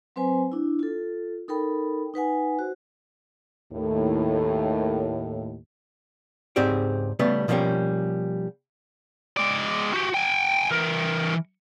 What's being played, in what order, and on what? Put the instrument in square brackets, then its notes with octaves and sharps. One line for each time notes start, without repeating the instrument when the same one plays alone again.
[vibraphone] F#3 C4 B4 C5 G#5
D4 E4
F4 A4
D#4 A4 A#4 G5 B5
D#4 B4 F#5 G#5
F#4 C5
[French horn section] D#2 A2
[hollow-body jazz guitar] C#2 G#2 C4 G4 G#4 D5
C#3 G3 A3 B3
B2 F3 G3 A#3 C#4 G4
[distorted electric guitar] G#3 D5
F#4 G4
G5 G#5
E3 A#4